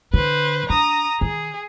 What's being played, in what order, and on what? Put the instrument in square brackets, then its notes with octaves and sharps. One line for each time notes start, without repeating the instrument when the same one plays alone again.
[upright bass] D3 [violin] B4 C5
[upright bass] D4 [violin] A#5 D#6
[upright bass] D#3 [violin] G#4